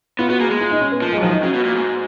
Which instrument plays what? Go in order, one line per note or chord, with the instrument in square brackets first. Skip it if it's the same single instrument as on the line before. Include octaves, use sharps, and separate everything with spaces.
[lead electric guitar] B3 [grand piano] F4
[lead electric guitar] B3 [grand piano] F#4
[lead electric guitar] A#3 [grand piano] G#4
[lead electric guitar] G#3
[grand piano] F4
D#4
C#4
B3
[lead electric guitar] F3 [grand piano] A#3
[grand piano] G#3
F#3
[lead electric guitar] D#3 [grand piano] F3
[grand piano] D#4
[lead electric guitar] C#3 [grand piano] F#4
[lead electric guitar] B2
A#2
G#2